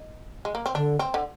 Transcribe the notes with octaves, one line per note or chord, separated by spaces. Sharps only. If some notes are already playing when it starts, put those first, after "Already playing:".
Already playing: D#4
G#3
A#3
C4
D3 D4
C4
D3